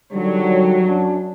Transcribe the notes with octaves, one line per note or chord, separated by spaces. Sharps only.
D3 D#3 F#3 G3
F#2 D4